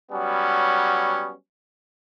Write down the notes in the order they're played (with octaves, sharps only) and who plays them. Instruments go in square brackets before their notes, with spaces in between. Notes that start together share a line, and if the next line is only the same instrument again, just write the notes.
[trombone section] F#3 G3 B3 C#4